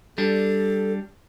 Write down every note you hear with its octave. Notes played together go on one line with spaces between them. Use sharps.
G3 D4 A4